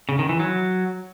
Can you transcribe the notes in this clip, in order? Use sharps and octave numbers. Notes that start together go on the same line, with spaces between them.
C#3
D#3
E3
F#3